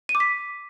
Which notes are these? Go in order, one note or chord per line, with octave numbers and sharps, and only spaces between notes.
D#7
D6
B6